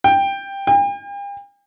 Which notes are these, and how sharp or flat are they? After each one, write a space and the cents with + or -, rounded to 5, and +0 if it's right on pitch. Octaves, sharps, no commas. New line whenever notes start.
G5 +10
G5 +45